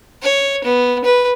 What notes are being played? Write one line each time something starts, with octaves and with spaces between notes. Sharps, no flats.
C#5
B3
B4